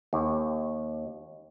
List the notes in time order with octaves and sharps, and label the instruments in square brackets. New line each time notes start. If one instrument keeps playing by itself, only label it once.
[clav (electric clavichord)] D#2